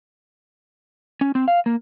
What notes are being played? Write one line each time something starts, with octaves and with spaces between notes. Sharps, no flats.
C#4
C4
F5
A#3